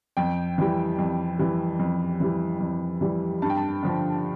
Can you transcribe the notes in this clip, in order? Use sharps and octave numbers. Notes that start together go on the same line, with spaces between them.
F2 G5
E3 G3
F2
E3 G3
F2
E3 G3
F2
E3 G3
G2 A5
G5
A5
D3 F3